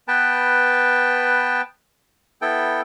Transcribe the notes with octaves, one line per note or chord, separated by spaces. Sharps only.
B3 B4 G5 A5
B3 E4 A4 G5